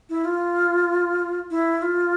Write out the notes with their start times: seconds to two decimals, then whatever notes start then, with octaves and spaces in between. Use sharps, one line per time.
0.09 E4
0.25 F4
1.51 E4
1.82 F4